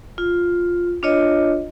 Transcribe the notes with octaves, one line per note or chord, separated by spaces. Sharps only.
F4
D4 F4 C#5 D#5